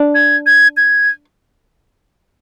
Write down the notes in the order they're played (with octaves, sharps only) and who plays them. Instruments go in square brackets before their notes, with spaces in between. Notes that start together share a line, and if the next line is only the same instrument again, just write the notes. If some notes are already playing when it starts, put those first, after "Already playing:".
Already playing: [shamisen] D4
[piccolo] G#6
G#6
G#6